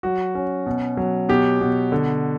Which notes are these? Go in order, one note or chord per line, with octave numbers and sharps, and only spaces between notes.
F#3 F#4
C#4
B2
F#3
B2 G4
B2
D3